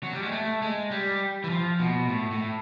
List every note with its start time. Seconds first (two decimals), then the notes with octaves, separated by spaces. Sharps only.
0.03 F#3
0.13 G3
0.23 G#3
0.32 A3
0.62 G#3
0.91 G3
1.44 E3
1.50 F3
1.79 B2
2.09 A2
2.31 A2